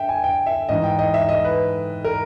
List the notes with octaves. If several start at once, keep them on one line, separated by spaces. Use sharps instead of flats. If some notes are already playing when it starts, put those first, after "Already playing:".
Already playing: G2 E5 G5
G#5
G5
E5
G#2 E3 D#5
G5
D#5
E5
D#5
B4
A#4